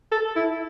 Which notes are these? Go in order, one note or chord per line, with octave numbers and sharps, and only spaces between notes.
A4
E4